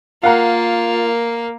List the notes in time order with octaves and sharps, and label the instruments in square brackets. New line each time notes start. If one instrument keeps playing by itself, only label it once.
[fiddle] A#3 [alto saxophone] F4 [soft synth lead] A#4 [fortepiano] F5 F#5 A#5